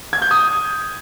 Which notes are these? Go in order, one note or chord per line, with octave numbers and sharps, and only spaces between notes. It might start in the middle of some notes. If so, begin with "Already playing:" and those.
G#6
G6
D#6